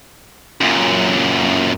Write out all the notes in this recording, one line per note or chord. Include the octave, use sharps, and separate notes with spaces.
F#2 A#2